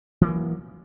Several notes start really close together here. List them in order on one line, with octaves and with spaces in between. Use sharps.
E3 A#3 F#3